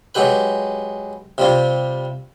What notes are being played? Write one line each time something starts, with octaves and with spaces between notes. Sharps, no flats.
F#3 G#3 G4 B4 B5
C3 G3 F4